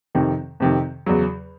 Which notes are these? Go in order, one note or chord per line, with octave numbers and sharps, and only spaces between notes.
F2 C3 D#3
F2 C3 D#3
E2 C#3 F#3